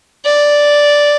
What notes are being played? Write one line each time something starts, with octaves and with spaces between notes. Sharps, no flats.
D5